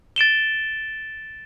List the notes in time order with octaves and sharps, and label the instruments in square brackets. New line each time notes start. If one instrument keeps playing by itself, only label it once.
[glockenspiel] A6 D7 E7 G7